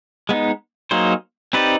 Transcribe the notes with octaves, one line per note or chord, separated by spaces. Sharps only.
G#3 B3 D#4
F#3 A#3 D#4 G#4 C5
C4 D#4 G4 B4 D5